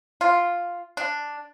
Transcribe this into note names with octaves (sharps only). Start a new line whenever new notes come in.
F4
D4